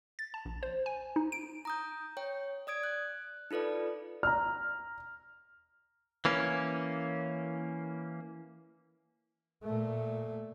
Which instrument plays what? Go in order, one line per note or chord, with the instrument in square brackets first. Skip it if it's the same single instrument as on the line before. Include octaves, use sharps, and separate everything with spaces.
[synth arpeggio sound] A6
A5
A#1
C5
G#5
D#4
D7
[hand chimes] A#5 D#6 G6
C#5 G5
D5 D#6 G#6 D7
F#6
D#4 F4 A4 B4 D5
[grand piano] A#5 F6
[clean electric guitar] E3 A#3 C#4
[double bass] A#2 A3